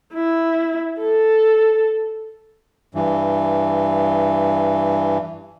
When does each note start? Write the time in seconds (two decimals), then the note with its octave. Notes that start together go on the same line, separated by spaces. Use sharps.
0.14 E4
1.00 A4
2.95 G2 E3